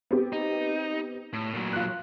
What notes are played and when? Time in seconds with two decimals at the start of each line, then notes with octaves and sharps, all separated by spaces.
0.11 B3 C4 G4
0.33 D#4
1.33 A2
1.53 A#2 F#3
1.73 F4 F#6